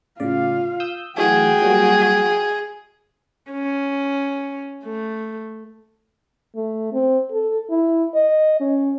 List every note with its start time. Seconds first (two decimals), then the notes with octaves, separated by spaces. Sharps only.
0.20 A2 C#3 F4 D5 F5
0.80 D#6 E6 G6
1.17 E3 F#3 A3 F#4 G#4 G5
1.62 F#3 G3 A#3
3.51 C#4
4.84 A3
6.55 A3
6.93 C4
7.31 A4
7.70 E4
8.15 D#5
8.60 C#4